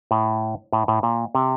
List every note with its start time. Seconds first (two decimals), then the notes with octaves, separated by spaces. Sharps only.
0.11 A2
0.73 A2
0.88 A2
1.03 A#2
1.35 C3